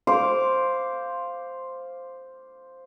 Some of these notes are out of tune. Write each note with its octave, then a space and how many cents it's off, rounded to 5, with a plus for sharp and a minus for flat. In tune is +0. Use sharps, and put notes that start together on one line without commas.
C5 +0 F5 +0 D6 -10